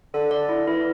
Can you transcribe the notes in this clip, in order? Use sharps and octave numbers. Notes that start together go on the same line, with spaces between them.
D3 A4
D5
E4
E3 E4